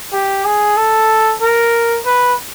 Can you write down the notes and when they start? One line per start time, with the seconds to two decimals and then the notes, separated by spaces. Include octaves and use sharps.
0.13 G4
0.45 G#4
0.77 A4
1.42 A#4
2.05 B4